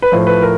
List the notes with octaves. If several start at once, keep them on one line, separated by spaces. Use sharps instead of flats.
B4
A2 F3 C5
B4
A#4